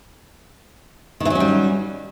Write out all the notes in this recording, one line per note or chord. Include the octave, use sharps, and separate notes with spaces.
D#3 E3 F#3 G3 C#4